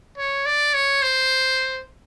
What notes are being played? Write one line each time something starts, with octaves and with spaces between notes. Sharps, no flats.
C#5
D5
C#5
C5